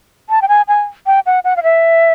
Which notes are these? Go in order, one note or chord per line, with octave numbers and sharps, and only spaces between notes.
A5
G5
G#5
G#5
G5
F#5
F#5
F5
E5